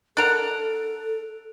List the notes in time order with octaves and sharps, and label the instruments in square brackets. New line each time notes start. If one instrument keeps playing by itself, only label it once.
[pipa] D4 A#4 F#5 [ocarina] A4 [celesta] F#6 D7 F7